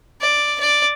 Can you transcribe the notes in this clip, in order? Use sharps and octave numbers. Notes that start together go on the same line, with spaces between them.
D5
D5